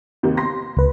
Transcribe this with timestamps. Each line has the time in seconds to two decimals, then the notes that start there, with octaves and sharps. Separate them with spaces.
0.23 D#2 C3 D#3
0.37 C6 A#6
0.77 C#2 B4